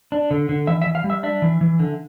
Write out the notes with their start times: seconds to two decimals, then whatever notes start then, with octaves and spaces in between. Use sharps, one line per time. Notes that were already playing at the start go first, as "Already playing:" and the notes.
0.12 D4
0.31 D3
0.49 D3
0.67 E3 E5
0.82 E5
0.86 E3
0.95 F5
1.04 G3
1.10 E5
1.23 D4 E5
1.42 E3
1.61 E3
1.79 D3